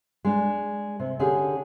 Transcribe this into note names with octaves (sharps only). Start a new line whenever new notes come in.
G#3 D4
C3
D3 C#4 G4 G#4